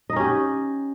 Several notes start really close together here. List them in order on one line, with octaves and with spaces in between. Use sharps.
D#5 D#4 C#4 G4